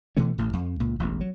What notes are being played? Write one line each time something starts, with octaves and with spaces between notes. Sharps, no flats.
B2 E3 A3 C#4
A1 A2
F2
C#2 A#2
E1 A1
F#3